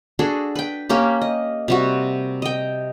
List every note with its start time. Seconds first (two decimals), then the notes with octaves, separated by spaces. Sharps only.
0.19 D4 F#4 G#4 A4
0.55 B4 G5
0.89 A#3 C#4 G4
1.22 D#5
1.68 C3 G3 F#4
2.42 D#5 G5